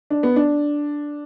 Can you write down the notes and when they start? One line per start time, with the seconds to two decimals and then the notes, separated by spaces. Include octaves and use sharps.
0.10 D4
0.23 B3
0.36 D4